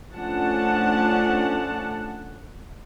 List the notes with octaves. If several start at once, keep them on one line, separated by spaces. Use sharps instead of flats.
F3 A3 C#4 D4 F#5 A5